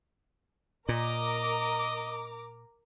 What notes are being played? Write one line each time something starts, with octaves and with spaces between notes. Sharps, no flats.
A#2 A#4 D#5 A#5 D6